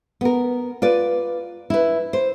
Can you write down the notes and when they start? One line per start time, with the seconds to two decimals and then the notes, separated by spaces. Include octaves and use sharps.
0.21 B3 A#4
0.82 F4 B4 D5
1.70 E4 B4
2.13 C5